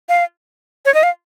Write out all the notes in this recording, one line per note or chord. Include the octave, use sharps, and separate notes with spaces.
F5
C#5
D#5
F5